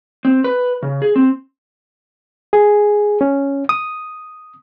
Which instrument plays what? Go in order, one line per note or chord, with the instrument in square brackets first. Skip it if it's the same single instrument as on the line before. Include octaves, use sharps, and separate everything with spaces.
[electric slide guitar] C4
B4
C#3
G#4
C4
[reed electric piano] G#4
C#4
D#6